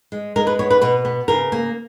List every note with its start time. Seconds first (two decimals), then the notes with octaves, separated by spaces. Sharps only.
0.12 G#3
0.36 G#3 A#4
0.47 B4
0.59 B3 C#5
0.70 B4
0.81 B2 B4
1.05 B3
1.28 C#3 A#4
1.52 A#3